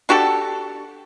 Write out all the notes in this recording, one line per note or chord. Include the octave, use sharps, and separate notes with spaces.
D4 F#4 G4 A4